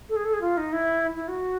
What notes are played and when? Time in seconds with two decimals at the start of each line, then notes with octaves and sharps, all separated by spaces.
0.09 A4
0.16 G#4
0.25 A4
0.33 G#4
0.41 F4
0.57 D#4
0.73 E4
1.16 E4
1.28 F#4